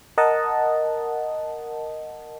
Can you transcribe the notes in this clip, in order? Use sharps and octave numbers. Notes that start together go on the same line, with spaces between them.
A#4 D#5 F#5 A5